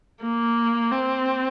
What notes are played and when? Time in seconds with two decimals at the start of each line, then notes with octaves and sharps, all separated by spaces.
0.22 A#3
0.92 C4